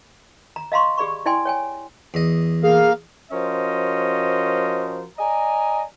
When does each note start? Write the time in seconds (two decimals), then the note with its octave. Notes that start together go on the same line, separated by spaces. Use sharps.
0.56 A#5
0.72 D#5 F5 A#5 C6 C#6
0.97 G4 G#4 D5 B5 C#6
1.26 E4 D5 G5 G#5 C6
1.45 C#5 G5 G#5
2.14 E2 D#5
2.63 A#3 G#4 F5
3.31 F3 C#4 F#4 A#4 C5 D#5
5.18 D5 D#5 G#5 A#5